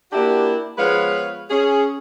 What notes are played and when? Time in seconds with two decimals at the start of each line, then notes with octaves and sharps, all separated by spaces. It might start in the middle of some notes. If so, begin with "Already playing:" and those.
0.12 A#3 D4 E4 F#4 G4
0.78 F3 G#3 B3 B4 C#5 F5
1.51 C#4 G#4